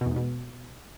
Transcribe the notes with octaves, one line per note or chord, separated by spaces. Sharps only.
B2
E2
G#2
B2